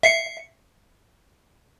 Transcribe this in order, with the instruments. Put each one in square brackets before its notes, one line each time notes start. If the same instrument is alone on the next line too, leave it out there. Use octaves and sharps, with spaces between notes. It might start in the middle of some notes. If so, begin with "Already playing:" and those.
[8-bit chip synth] E5 C7 C#7